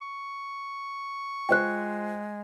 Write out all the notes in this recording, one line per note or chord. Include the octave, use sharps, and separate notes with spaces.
C#6
G#3 F4 C5 G5 F#6